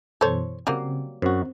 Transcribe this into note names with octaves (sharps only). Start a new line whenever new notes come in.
F#2 B2 E3 A4 C5 C#5
C#3 F#3 G3 A#3 C4
F#2 C4 F#4